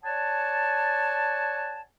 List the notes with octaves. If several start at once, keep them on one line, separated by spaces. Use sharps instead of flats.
C#5 D5 F#5 G#5 A5